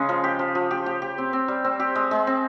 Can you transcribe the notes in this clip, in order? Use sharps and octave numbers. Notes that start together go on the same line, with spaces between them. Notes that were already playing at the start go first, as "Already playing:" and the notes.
Already playing: C#3 G#3
F3
G4
F3
F3
G4
G4
G4
C4
C4
G3
C4
G4
G#3
G#3
C4